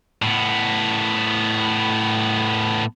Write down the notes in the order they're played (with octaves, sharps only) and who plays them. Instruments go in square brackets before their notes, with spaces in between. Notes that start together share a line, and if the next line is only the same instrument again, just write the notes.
[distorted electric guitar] A2 B3